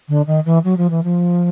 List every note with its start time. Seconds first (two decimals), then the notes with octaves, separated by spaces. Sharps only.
0.09 D3
0.27 D#3
0.46 E3
0.64 F#3
0.77 F3
0.90 E3
1.04 F3